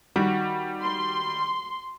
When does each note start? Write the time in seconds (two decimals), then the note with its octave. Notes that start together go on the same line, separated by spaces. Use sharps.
0.16 D#3 G3 F#4
0.83 C6